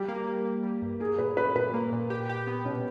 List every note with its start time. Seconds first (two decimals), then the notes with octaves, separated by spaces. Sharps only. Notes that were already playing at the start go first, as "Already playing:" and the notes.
Already playing: G3 G4
0.08 A#3
0.27 A#3
0.45 A#3
0.63 G3
0.82 G2
1.00 A#3 G#4
1.18 A#2 B4
1.37 C#4 B4
1.56 A#2 B4
1.74 A#3
1.92 A#2
2.10 G4
2.29 G4
2.47 B3
2.65 B2 C#4